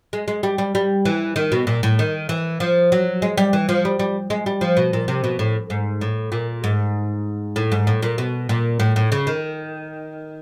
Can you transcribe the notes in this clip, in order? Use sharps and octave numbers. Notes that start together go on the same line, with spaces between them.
G#3
G#3
G3
G3
G3
E3
D#3
B2
A#2
A2
D#3
E3
F3
F#3
G#3
G3
E3
F3
G3
G3
G#3
G3
F3
B2
A#2
C3
B2
A2
G#2
A2
A#2
G#2
A2
G#2
A2
A#2
B2
A#2
A2
A2
C#3
D#3